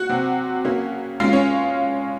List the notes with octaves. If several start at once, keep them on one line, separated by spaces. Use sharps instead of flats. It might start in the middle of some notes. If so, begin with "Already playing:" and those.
Already playing: F#4 F#5
C3 F#3 C4
C#3 F#3 A#3 C#4
C#3 G#3 C#4 F4 F5
C#4 C#5